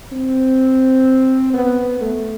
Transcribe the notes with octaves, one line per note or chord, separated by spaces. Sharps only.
C4
B3
A3